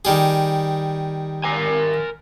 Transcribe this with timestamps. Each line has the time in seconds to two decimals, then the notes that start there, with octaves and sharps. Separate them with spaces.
0.05 D#3 G3 G#4
1.44 A#4 G#5